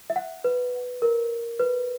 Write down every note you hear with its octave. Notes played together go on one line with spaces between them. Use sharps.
E5
F#5
B4
A#4
B4